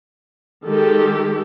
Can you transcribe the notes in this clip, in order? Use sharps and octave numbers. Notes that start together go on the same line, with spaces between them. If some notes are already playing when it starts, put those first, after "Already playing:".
D#3 G#3 G4 A4